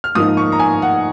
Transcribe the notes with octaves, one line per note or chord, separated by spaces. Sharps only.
F6
G#2 F3 A#3 D#4 D#6
C#6
A#5
G#5
F#5